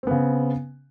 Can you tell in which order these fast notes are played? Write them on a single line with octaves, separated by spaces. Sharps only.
C4 B3 C#3